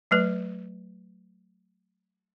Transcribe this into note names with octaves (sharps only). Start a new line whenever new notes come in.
F#3 A3 B4